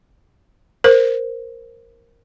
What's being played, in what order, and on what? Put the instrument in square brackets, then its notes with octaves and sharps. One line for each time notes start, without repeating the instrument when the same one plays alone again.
[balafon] A#4 C5